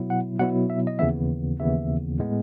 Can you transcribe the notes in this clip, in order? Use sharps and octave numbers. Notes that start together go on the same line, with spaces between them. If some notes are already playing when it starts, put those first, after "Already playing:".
Already playing: B2 F#3 B3 E4
F#5
B2 F#3 B3 E4 F#5
E5
D#5
D#2 C#3 E3 B3 E5
D#2 C#3 E3 B3 E5
A2 G#3 B3